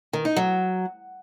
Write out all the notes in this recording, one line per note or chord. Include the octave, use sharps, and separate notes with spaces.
D#3
D#4
F#3